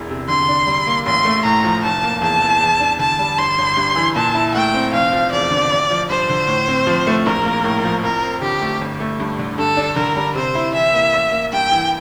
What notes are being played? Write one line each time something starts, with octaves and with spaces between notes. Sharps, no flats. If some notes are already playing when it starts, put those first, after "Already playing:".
Already playing: E1 E2 E3
C3
D3 C6
D4
G3
A#3
A1 C6
A3
A2 A#5
F3
F1 A5
A#3
E2 A5
E3
E2
D4
D3 A5
G3
G1 C6
G1
G2
E3
A#2 A5
E4
A3 G5
C4
F1 F5
F3
E2 D5
D3
A1
F3
G2 C5
D3
A2
C4
F3
A3
A#1 A#4
A#3
A2
F3
F2 A#4
C4
D3 G4
A3
G1
A3
G2
D3
G2 A4
D4
D3 A#4
G3
C3 C5
E4
E3 E5
A#3
A1
A#3
G2 G5
E3